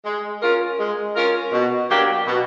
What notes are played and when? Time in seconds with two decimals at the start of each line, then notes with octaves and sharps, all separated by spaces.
0.05 G#3
0.42 C#4 F4 A#4
0.79 G#3
1.16 C#4 F4 A#4
1.52 B2
1.89 F#3 A#3 D4 G4
2.26 B2